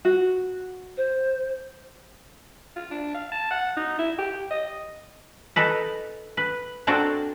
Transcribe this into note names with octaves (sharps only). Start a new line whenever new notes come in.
F#4
C5
F4
D4
F5
A5
F#5
D#4
E4
G4
D#5
D#4 A4 B4
B4
A#3 C4 D4 F#4 A4 G5